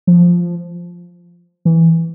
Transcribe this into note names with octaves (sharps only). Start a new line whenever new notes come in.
F3
E3